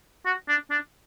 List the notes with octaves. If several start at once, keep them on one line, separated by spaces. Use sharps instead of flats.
F#4
D4
D4